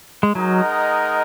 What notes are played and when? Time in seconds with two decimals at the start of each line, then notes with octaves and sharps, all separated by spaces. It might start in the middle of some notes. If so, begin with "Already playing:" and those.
0.23 G#3
0.35 F#3 G#3 D#4 A#4 D#5 F#5